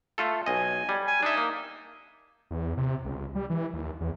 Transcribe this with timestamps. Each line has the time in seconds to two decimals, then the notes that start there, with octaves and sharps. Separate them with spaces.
0.18 A3 F4 A4
0.46 B1 D#5 G#5
0.89 G3
1.07 G#5
1.23 D4 D#4 E5
1.37 A#3
2.51 E2
2.77 C3
3.05 C#2
3.35 G3
3.50 E3
3.74 D#2
4.01 E2